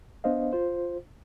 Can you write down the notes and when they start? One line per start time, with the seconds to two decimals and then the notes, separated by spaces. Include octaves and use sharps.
0.24 B3 D4 C5 D#5 F5
0.52 F4 C5